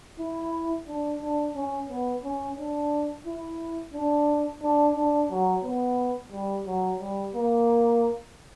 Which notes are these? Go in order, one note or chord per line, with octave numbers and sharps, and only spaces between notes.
E4
D4
D4
C#4
B3
C#4
D4
E4
D4
D4
D4
F#3
B3
G3
F#3
G3
A#3